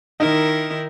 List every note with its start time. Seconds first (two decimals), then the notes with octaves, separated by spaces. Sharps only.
0.20 D#3 D#4 E4 A#4